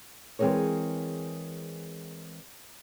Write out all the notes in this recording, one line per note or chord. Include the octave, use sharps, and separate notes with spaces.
E3 G#3 C4 G#4 A#4 C#5